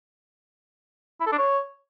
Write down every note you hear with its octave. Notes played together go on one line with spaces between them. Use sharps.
E4
A4
D4
C#5